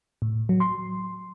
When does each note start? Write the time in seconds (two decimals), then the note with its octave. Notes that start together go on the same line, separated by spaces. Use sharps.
0.22 A2
0.49 F#3
0.60 C6